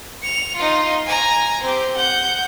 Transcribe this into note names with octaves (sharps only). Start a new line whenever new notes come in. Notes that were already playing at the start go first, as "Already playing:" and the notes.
C#7 F7
D#4 F4
G#5 A#5
C4 G4
F#5 G6